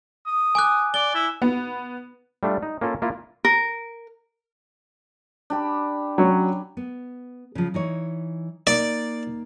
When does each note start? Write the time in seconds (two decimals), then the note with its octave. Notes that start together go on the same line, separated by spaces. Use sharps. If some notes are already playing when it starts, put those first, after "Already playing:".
0.26 D#6
0.55 G#5 D6 F#6
0.94 D5 G7
1.14 E4
1.42 B3
2.43 G3 A3 D4 F4
2.63 D#4
2.81 A#3 C#4 F4 A4
3.02 A#3 E4 F4
3.45 A#4
5.50 D4 G4 B5
6.18 F#3 C#4
6.77 B3
7.55 C#3 F3
7.74 E3 D#4 C#5
8.67 A#3 D#4 D5